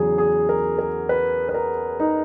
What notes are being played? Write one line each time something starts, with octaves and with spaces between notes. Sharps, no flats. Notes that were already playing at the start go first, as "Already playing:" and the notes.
Already playing: E2 C#3 F#3 G#4
G#4
A#4
A#4
B4
B4
A#4
D#4